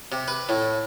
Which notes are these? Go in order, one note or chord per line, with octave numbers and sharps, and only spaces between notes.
C3
B4
A2